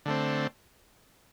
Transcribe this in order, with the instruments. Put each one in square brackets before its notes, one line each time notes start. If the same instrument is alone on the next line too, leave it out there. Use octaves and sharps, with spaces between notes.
[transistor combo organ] D3 A3 C4